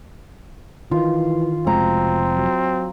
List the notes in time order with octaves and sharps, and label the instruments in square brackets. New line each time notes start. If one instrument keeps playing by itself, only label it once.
[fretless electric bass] D#3 [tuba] E3 [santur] F4
[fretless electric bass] F1 G#3 [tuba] B2 [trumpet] C4 [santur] A#5
[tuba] F#3